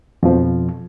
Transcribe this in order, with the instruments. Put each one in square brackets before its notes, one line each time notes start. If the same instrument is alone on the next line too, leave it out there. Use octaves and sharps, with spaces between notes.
[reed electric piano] F2 B2 F3